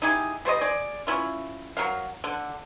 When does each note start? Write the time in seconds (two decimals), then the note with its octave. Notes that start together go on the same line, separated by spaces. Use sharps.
0.02 D#4 E4 G4 G#4
0.45 G3 C5 C#5 D#5
0.61 G#4 D5
1.07 C#4 E4 F4
1.77 F#3 A#4 F5
2.24 D3